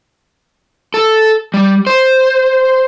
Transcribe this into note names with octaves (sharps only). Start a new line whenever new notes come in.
A4
G3
C5